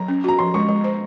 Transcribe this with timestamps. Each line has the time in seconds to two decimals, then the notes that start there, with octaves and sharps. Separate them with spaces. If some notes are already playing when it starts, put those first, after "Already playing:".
Already playing: F#3 A#5
0.08 C#4
0.24 F#4 A#5
0.39 F3 C6
0.54 G#3 C#6
0.69 G#3
0.84 C5